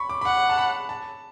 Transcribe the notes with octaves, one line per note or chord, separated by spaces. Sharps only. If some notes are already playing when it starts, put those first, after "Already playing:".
Already playing: B5 C#6
D6
B5
F#5 C#6
A5
B5
A5